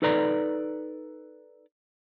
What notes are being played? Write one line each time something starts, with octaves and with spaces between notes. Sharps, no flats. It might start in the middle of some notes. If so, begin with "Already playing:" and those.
D#4 A4 B4 D5 A#5